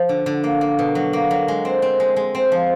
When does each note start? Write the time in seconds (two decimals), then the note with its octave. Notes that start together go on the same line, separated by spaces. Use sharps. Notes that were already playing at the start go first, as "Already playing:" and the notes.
Already playing: F3
0.09 D3
0.26 D3
0.44 A#3
0.61 A#3
0.79 B2
0.95 F#3
1.13 A#3
1.31 F#3
1.48 G#3
1.65 C4
1.82 C4
2.00 G#3
2.16 G#3
2.35 C4
2.52 F3